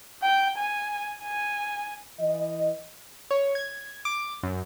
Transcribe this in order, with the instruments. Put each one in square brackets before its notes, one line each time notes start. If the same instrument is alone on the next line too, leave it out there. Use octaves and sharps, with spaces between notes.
[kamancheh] G5
G#5
G#5
[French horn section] E3 D#5
[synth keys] C#5
G#6
D6
F#2